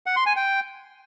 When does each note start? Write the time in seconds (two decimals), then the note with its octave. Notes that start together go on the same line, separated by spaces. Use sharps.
0.06 F#5
0.16 C6
0.26 G#5
0.36 G5